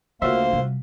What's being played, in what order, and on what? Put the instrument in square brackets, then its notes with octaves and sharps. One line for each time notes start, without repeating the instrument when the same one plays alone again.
[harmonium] D2 A#3 F5 [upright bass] C#3 [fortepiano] F4 F#4 E5 [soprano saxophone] C5
[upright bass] C3 G3